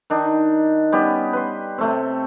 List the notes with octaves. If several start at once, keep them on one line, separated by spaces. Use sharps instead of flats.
D#3 D4 D#4
G3 B3 C#4 G4
B4 C6
C3 A3 C4